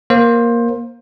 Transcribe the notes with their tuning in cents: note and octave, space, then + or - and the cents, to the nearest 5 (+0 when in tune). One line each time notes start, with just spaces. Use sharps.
A#3 +10 C5 +20